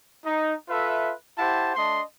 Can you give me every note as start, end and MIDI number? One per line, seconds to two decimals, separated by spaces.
0.25 0.54 63
0.69 1.13 65
0.69 1.13 69
0.69 1.13 71
0.69 1.13 76
1.39 1.74 64
1.39 1.74 67
1.39 1.74 72
1.39 1.74 78
1.39 1.74 81
1.76 2.01 57
1.76 2.01 62
1.76 2.01 75
1.76 2.01 81
1.76 2.01 84